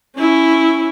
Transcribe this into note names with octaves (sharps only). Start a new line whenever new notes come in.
C#4 E4